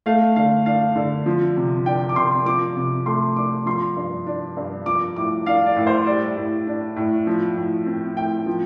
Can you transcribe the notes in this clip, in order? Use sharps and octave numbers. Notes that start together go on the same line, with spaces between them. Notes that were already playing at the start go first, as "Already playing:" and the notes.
A3 F5
D3 F5
D4 F5
D3
F3
C3
D4 G5
D6
C3 C6
F3 D6
C3
A3 C6
D4 D6
F3 C6
G2
D4
G2
F3 D6
A2 D6
D4 F5
D5
A2
C5
G3 D5
A2
D4
A2
F3
A2
C4
A2 G5
F3